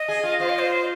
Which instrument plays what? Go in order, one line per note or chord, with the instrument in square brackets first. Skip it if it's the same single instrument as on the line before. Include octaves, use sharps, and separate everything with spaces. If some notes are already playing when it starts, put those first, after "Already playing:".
Already playing: [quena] D#5
[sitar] G#4
F4
[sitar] F4 [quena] C5
[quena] D#5
C5